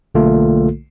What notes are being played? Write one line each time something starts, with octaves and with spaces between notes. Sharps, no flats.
B1 D3 A3 A#3 F4 A4